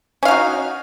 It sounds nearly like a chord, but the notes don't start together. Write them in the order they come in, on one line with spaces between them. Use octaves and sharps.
C#4 F5 D#4 F#4